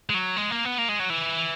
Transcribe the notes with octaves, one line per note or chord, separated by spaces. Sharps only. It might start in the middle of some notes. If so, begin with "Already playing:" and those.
G#3
F#3
G#3
A#3
B3
A#3
G#3
F#3
E3